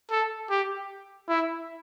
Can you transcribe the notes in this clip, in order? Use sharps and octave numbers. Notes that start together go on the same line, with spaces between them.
A4
G4
E4